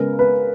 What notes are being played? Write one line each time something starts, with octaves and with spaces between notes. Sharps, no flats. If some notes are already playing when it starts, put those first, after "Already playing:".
Already playing: C#3 G#3 B3 A#4
B4